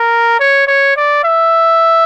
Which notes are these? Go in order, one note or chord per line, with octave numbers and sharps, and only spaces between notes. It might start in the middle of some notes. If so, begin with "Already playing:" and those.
Already playing: A#4
C#5
C#5
D5
E5